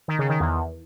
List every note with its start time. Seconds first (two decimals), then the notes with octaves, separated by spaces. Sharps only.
0.08 D#3
0.19 C#3
0.29 D#3
0.40 E2